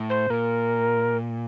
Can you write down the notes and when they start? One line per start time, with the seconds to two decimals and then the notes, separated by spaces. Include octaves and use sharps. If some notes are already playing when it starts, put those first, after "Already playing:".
Already playing: A2
0.10 C5
0.30 A#2 A#4